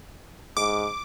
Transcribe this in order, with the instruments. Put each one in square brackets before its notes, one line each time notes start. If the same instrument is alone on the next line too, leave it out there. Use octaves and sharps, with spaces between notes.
[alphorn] G#2 [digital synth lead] D6